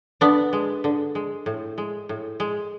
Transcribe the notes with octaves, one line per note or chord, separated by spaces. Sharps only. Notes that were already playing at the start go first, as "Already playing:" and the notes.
D3 B3 D4
G#3
D3
G#3
A2
G#3
A2
G#3